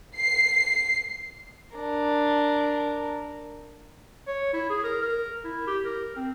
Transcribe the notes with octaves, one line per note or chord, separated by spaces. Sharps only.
C7
D4 A#4
C#5
E4
G#4
A#4
A#4
E4
G4
A#4
C4